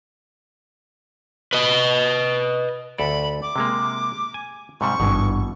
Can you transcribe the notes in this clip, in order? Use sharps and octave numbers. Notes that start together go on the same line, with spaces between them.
B4 D#5
D2 A4 D5 B5
D6
C3 G#3 A#3
G#5
G#2 C3 G3 C#6
G#1 G2 B2 E3